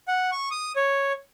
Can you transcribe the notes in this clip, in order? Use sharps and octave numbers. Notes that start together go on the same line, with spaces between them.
F#5
C#6
D#6
C#5